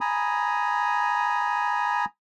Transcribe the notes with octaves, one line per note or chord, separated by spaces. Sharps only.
G#5 A#5 B5 D#6